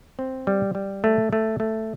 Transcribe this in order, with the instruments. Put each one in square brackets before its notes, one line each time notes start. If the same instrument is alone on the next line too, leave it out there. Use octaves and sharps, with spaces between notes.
[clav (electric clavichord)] C4
G3
G3
A3
A3
A3